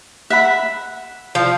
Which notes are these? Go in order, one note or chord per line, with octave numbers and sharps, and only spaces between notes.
E5 F#5 B5
F3